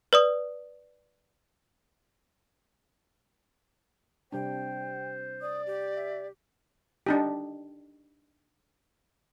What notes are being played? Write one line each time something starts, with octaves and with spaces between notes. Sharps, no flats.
B4 D5 D#6
C3 G3 D4 C5 G5
D5 D#6
G4
E5
D4 D#4 G4